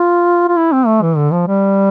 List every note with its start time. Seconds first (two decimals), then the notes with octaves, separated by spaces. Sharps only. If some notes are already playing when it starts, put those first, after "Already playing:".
Already playing: F4
0.49 F4
0.57 E4
0.72 C4
0.86 A3
1.02 E3
1.17 D3
1.32 F3
1.47 G3